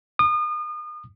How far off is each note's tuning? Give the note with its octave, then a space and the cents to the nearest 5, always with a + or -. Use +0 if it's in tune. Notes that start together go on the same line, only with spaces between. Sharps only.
D#6 -35